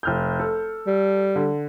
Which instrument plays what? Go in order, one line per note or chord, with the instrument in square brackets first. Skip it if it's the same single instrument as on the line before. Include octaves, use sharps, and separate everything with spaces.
[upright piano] F1 F6 G6
A4
[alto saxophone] G3
[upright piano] D3